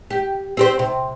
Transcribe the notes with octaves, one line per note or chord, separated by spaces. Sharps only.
G4
C4 G4 C5
C3